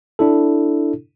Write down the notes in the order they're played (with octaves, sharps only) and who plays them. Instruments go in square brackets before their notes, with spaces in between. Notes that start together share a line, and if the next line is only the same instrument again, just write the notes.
[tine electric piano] D4 E4 A4